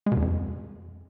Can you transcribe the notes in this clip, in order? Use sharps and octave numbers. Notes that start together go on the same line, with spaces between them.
G#3
B2
E2
F2